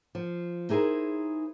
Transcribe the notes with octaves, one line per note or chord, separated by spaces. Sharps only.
F3
D#4 E4 G#4 A#4 C5